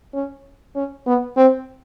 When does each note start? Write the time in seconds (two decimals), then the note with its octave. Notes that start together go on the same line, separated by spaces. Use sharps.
0.14 C#4
0.75 C#4
1.07 B3
1.37 C4